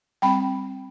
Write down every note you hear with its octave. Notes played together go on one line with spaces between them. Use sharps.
G3 C4 G5 B5